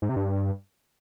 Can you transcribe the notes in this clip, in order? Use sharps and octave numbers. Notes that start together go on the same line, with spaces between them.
G#2
C3
G2